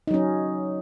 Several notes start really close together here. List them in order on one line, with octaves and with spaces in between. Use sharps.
D#4 F#3 C#4